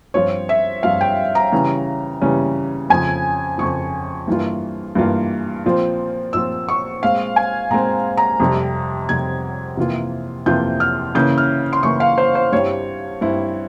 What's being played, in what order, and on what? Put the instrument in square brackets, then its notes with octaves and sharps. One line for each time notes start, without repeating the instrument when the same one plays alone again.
[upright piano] G2 F3 C4 F4 [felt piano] C#5
[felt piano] E5
[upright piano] G2 F3 C4 F4 [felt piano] F5
[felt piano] G5
A#5
[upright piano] C#3 E3 G3 C#4
C#3 E3 G3 C#4
[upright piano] F2 C#3 F3 [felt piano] G#5
[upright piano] F2 C#3 F3 [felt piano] C#6
[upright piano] G2 E3 A#3 F4
G2 E3 A#3 F4
A#2 F3 C4 F4
[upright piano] A#2 F3 C4 F4 [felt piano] E6
[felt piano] C#6
[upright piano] A#2 G#3 C4 [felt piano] F5
[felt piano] G#5
[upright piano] A#2 G#3 C4 [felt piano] A#5
[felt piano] A#5
[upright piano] F2 C3 G3
[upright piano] F2 C3 G3 [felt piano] G#6
[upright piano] F2 C3 E3 A#3 F4
[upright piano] F2 C3 E3 A#3 F4 [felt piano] G6
[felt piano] F6
[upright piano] C#3 E3 A#3 C#4 E4 [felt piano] G6
[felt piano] F6
C6
[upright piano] C#3 E3 A#3 C#4 E4 [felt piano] C#6
[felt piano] F5
C5
C5
[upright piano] G2 G3 C4 E4 [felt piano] C#5
[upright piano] G2 G3 C4 E4